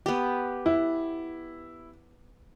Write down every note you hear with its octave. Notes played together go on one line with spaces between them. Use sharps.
B3 G4
E4